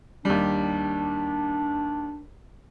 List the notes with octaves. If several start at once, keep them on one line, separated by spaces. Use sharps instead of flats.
D#2 G3 D4